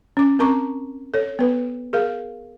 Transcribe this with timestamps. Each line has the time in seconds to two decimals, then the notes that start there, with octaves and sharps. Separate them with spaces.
0.17 C#4 D6
0.39 C4 A#4 A#5 C#6 D6
1.14 A4 C#5
1.39 B3 B4
1.93 G#4 A#4 F5